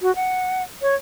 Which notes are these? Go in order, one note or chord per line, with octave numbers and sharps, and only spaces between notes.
F#4
F#5
C#5